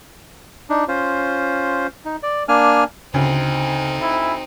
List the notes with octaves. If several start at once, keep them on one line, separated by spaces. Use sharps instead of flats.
D4 D#4
C#4 F4 C5
D#4
D5
A#3 D4 G#5 F6
D2 C#3 C4 D#4
E4